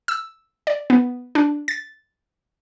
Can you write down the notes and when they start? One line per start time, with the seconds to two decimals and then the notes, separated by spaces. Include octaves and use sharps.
0.08 E6
0.67 D5
0.90 B3
1.35 D4
1.68 A6